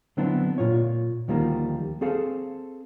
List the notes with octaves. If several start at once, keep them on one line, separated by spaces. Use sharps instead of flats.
D3 F#3 B3 C4 D4 E4
A#2 F4 C#5
D2 D#3 F3 G3 A#3
C4 G#4 A4 F5